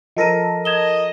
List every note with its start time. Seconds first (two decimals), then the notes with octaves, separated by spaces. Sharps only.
0.17 F3 A4 A#4 D#5 A#6 D#7
0.65 D#5 G#6 E7 G7